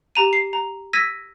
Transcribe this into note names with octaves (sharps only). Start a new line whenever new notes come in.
G4 A#5 D#7
C7
A#5
E6 G#6 A#6 B6 D#7